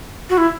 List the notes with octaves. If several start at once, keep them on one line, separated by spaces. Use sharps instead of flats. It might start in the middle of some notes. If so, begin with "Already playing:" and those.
F#4
E4